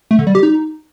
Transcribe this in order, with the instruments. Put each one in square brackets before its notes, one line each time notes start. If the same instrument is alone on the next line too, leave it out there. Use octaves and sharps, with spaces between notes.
[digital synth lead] A3
D3
G3
G4
D#4